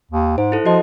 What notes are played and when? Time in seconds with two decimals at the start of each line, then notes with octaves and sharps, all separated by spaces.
0.12 D#2
0.38 G#2 C5
0.52 E4 A4
0.66 F3 F#4 D#5